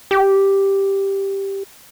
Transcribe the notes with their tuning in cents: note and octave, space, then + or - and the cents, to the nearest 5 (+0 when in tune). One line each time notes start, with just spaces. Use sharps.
G4 +0